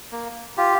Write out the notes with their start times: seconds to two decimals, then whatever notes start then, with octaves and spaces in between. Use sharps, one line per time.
0.12 A#3
0.57 F4 G4